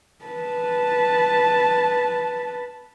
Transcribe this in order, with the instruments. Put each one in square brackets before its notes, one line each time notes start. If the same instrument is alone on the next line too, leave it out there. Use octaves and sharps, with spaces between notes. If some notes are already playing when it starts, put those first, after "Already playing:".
[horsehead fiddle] B4 A5